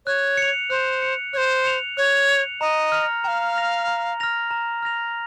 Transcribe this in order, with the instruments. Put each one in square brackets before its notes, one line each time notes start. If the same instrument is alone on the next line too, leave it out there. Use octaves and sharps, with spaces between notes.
[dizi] C#5 [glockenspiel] F#6
[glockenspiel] C#7 F7
[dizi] C5 [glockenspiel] F#6
[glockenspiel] C#7 F7
[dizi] C5 C#5 [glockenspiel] F#6
[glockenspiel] C#7 F7
[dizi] C#5 [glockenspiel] F#6
[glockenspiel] C#7 F7
[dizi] D#5 [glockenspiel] A#5
[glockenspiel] F6 A#6 F7
[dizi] F5 G5 [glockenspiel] A#5
[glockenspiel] F6 A#6 F7
A#5
F6 A#6 F7
A#5
F6 A#6 F7